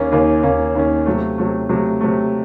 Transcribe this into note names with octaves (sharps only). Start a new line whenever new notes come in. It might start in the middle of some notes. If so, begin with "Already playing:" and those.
Already playing: D#2 D#3 A#3 C#4
D#2 D#3 A#3 C#4
D#2 D#3 A#3 C#4
D#2 D#3 A#3 C#4
C3 F#3 A3
C3 F#3 A3
C3 F#3 A3
C3 F#3 A3